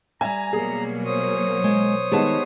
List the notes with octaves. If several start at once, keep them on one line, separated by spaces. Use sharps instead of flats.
G3 E5 G#5 A#5
B2 F#3 A#3 G#4
C5 C#5 D#6
G#3
D#3 G3 G#3 B3 A5